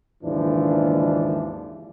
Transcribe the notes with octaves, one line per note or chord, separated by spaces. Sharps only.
F#1 D#2 G#2 E3 F3 D4